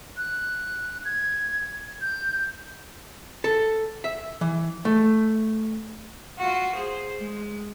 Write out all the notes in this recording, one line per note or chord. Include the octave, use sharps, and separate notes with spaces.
F#6
G#6
G6
A4
E5
E3
A3
F4 F#4
G#4 C5
G#3